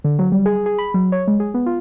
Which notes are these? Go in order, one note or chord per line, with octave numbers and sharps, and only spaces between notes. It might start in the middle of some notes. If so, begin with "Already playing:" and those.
D3
F#3
G3
G#4
G#4
B5
F#3
C#5
G#3
G#4
B3
F4